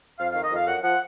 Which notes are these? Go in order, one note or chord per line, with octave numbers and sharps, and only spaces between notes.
F2 F5
D#3 F5
D#5
F2 F5
F#2 F#5
F3 F#5